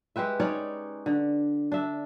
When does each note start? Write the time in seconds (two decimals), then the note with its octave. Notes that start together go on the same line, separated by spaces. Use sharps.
0.16 G#3 G4 B4 E5
0.40 C#4 D#4 C#5 D5
1.06 D3
1.72 D4 E5